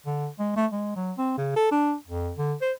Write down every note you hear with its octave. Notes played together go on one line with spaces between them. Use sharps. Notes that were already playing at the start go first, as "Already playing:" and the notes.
D3
G#3
A3
G#3
F#3
C4
C#3
A4
D4
F2
D3
C5